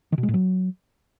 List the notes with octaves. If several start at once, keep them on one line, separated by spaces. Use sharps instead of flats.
D#3
B2
G#3
A2
F#3